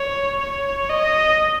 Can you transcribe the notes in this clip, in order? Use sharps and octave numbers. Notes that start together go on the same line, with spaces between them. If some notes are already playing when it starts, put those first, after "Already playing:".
Already playing: C#5
C#5
D#5